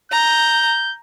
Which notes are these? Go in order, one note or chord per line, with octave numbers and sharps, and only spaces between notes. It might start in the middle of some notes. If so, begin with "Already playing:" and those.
A#5 G6